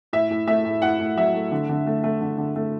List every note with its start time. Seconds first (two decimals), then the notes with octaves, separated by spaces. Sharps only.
0.13 A2 E5
0.30 A2
0.47 A3 E5
0.65 A2
0.82 A2 F#5
0.99 A2
1.17 F#3 E5
1.34 A3
1.52 D3
1.69 D3
1.87 A3
2.04 A3
2.21 D3
2.38 D3
2.56 A3